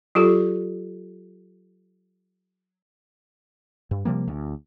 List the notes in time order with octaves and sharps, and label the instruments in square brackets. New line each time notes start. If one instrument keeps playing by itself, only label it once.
[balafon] F#3 F4 G4 A4
[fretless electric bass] G2
C3 F3 G3 A#3
D2